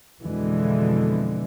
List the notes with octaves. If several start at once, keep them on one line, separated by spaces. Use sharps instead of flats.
F2 B2 D3 E3 G#3